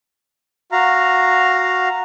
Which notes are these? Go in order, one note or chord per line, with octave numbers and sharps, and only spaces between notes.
F#4 F5 A#5